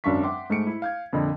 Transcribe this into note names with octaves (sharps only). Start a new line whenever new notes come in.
G#1 F#2 D4 F5 C#6 B6
E5 F#5 G5 C6 D6
G#2 A3 G#5 C#7 D7
E4
F5 G6 G#6
F2 A#2 D3 D#5 B5